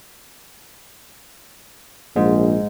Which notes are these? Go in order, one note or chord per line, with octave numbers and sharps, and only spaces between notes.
A#1 G#2